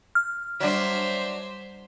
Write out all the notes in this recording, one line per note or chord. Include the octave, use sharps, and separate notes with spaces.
F6
F#3 G3 D4 C5 D5 E5